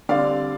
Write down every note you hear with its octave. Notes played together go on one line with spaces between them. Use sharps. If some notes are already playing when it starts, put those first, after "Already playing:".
D3 G3 C4 D5 F5